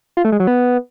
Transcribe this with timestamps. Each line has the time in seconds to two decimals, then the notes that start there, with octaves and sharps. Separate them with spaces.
0.17 F4
0.25 A3
0.32 G#3
0.40 F#3
0.47 B3